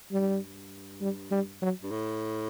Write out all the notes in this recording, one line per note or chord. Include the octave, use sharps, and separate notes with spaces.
G2 G3
G3
G3
F#3
G2
A2